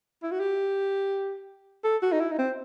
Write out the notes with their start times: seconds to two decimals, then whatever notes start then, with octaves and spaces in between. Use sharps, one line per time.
0.23 E4
0.32 F#4
0.40 G4
1.84 A4
2.02 F#4
2.12 D#4
2.20 E4
2.32 D#4
2.39 C4